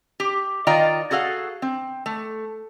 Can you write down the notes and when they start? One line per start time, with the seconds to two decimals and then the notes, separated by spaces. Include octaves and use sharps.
0.20 G4
0.67 D#3 F4 D5 D#5 G5 A#5
1.11 F#4 G#4 A4 F5 F#5
1.62 C4
2.06 A3